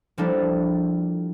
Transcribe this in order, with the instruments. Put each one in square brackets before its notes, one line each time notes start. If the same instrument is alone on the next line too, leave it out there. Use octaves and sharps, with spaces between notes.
[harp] F3 G3 A#3 D4 E4 A4